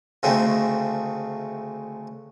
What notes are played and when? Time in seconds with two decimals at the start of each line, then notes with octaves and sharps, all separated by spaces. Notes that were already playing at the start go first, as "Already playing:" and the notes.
0.23 D2 C#3 G#3 A3 C4